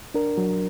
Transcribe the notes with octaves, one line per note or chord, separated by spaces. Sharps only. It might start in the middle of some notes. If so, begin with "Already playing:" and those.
D4 A#4
F#3